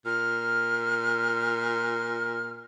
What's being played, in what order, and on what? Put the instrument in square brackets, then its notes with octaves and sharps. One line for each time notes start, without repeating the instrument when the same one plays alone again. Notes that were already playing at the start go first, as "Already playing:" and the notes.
[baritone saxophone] A#2 [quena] F6